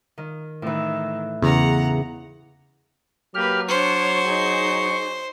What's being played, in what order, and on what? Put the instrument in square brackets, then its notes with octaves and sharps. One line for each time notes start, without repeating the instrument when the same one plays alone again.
[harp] D#3
[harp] A2 E3 [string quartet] D#3
[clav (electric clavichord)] E2 [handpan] C#3 [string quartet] F#5 A#5
[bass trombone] F#3 [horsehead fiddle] A#3 B4 [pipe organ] G4 F6
[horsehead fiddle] D4 C#5 [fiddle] C5 [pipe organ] C#6
[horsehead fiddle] D#4 G#4